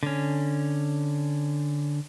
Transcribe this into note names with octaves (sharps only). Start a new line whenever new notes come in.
D3 C#4